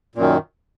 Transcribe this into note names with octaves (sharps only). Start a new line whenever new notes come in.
F#2 A#2 D#3